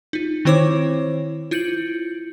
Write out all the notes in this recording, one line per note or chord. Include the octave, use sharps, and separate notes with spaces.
D#4 F4
D#3 C4 E4 C5 C#5 D6
E4 F4 G6 C#7 D7 F#7